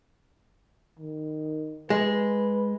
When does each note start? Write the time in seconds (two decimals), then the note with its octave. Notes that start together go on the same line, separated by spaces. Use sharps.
0.99 D#3
1.90 G#3 B4